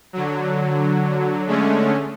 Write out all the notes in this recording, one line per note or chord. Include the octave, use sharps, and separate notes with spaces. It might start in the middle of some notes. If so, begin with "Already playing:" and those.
D3 F#3
D3 G#3 A3 C#4